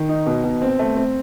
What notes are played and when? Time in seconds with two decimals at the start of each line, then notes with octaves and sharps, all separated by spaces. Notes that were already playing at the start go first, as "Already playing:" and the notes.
Already playing: D#3
0.09 D#4
0.26 B2
0.44 B2
0.62 C4
0.79 A3
0.97 C4